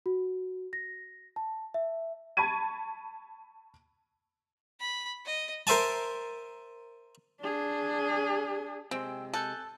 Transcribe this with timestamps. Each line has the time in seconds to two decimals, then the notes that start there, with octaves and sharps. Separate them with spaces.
0.06 F#4
0.73 A#6
1.36 A5
1.74 E5
2.37 A5 B5 C#6 G#6 D#7
4.80 B5
5.26 D#5
5.67 A#4 C5 E5 G#5 A5
7.41 D4 G#4
8.91 C3 G#3 C4 G5 G#5 E6
9.33 A4 G#5 F#6 G6